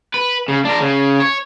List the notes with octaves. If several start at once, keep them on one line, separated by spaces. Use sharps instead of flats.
B4
C#3
D4 A#4
C#3
C#5